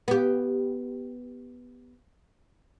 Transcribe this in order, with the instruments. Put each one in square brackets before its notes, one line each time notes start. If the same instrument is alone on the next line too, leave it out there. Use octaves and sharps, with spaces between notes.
[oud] B3 G4